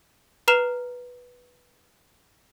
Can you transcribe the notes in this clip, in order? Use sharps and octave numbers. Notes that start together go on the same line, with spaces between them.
B4 A#5 F6 C7 E7 F7